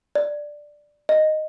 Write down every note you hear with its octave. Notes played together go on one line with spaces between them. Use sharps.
D5
D#5